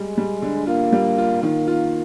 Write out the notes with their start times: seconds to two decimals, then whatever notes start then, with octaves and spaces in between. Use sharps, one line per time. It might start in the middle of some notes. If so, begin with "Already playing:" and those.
Already playing: G3 G#3
0.18 G3
0.42 D3
0.67 A#3 F4
0.92 G3
1.18 F4
1.43 D#3 A#3
1.67 F4